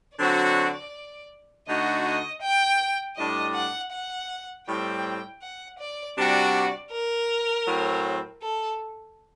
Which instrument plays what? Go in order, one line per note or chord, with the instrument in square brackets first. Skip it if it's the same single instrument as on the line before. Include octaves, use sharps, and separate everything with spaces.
[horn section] D3 F#3 C4 F#4 [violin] D5
[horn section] D3 A3 D#4 F#4 [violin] D#5
[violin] D#5
G5
[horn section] A2 G3 D4 [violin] D#5
[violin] F#5
F#5
[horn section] A2 G3 C4 [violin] G5
[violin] F#5
D5
[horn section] C3 G3 D4 F#4 [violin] D5
[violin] A#4
[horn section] A2 F#3 C4
[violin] A4